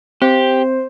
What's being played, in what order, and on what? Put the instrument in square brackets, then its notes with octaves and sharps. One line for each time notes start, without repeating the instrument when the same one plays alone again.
[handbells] C4 [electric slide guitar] G4 [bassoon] C5